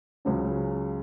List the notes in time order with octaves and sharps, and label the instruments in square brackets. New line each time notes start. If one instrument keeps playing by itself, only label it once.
[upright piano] C#2 C#3 F#3 C#4